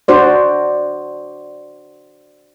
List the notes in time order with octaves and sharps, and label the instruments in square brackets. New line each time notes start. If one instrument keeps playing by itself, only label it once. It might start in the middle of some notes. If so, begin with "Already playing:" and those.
[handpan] D4 F#4 C5 D5